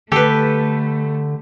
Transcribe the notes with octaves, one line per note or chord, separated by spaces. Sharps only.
D3 A3 G4 A4 B4